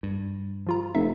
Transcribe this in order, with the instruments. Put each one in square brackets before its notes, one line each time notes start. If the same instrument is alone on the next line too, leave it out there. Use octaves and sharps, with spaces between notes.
[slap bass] G2
[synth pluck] F3 F4 A#5
[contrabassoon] F1 [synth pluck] D#4 E5